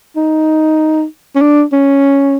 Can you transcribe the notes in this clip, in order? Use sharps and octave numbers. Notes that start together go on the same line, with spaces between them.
D#4
C#4
D4
C#4